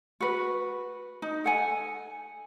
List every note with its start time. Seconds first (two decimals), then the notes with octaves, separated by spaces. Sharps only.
0.20 F#4 B4
1.22 D#4
1.44 A4 F#5 G#5